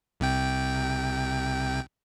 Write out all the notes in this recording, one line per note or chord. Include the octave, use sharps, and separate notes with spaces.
C2 C3 G5